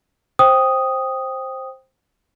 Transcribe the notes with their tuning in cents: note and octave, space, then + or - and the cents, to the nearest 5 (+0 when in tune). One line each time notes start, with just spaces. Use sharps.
C5 +10 G5 +0 D#6 +0